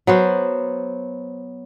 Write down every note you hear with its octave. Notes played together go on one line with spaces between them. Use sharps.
F#3 B3 C5